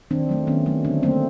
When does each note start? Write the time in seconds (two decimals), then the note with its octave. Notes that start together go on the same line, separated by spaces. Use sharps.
0.11 D#3 C4 D4
0.29 F#3 A3
0.47 D#3 B3 C#4
0.66 F#3 A3
0.84 D3 C4 D4
1.03 F#3 A3 A#3 C4